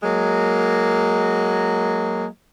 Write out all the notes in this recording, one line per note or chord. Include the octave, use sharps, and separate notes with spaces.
F#3 G#3 A#3